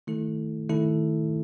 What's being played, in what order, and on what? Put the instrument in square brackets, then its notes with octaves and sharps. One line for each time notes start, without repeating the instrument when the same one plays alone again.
[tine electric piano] D#3 A3 E4 A4
D#3 A3 E4 A4